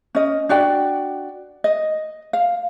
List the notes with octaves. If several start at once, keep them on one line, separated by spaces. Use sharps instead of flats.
C#4 D#5
D4 F#4 D5 G5
D#5
F5